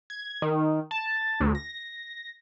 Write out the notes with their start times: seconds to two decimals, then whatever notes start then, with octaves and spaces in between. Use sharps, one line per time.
0.10 G#6
0.42 D#3
0.91 A5
1.40 D2
1.55 A#6